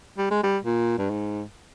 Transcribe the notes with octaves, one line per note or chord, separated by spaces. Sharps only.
G3
G#3
G3
A#2
G2
G#2